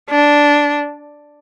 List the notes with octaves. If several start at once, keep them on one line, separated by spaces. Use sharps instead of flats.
D4